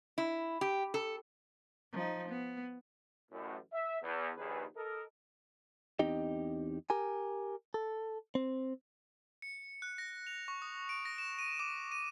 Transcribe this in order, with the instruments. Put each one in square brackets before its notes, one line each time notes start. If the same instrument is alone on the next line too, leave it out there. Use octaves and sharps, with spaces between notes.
[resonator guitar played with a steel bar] E4
G4
A4
[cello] F3 D#4
B3
[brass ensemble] A1 F#2 A2
E5
E2
A#1 D#2 G#4 B4
A4 A#4 D#5
[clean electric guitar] E2 C4 D#4 G4 D#5
G4 A#4 G#5
A4
C4
[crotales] C#7
F#6
A#6
F7
C#6
D#6
D7
A#6
E7
D#7
D6
D#7